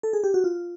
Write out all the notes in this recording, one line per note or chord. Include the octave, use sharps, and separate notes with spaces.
A4
G#4
G4
F#4
F4